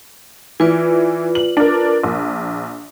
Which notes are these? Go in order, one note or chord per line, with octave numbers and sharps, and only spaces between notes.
E3 F4 B4 D5
F#7
D4 A#4
A#1